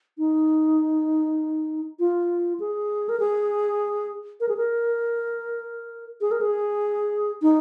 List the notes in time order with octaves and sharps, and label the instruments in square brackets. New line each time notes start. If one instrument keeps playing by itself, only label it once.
[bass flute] D#4
F4
G#4
A#4
G#4
A#4
G#4
A#4
G#4
A#4
G#4
D#4